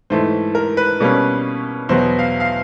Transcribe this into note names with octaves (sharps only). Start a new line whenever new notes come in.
G#2 E3 A3 C5
A#4
B4
B2 G3 A#3 C#4
E2 B2 F#3 B3 C5
F5
F5